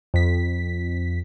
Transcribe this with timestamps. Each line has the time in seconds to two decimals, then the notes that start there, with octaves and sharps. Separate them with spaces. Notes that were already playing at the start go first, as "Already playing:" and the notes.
0.14 F2 B6